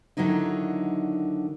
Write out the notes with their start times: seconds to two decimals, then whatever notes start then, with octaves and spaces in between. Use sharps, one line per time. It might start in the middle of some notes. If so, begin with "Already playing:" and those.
0.17 D3 D#3 F#3 D#4 E4